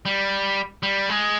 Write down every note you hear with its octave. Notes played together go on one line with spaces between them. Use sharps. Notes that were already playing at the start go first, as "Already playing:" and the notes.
G3
G3
G#3